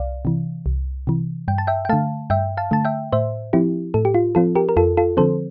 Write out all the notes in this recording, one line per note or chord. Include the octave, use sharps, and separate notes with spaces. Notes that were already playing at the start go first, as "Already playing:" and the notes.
Already playing: C2 D5 F5
C3 E3
C2
C3 E3
G2 G5
A5
E5 G5
G5
D3 A3 F5 A5
G2 E5 G5
F5 A5
D3 A3 A5
E5 G5
A2 C5 E5
F3 C4 E4 G4
A2 A4
G4
F4
F3 C4 F4 A4
G4 A#4
A#4
F2 F4 A4
F4 A4
D3 F3 C4 A4 C5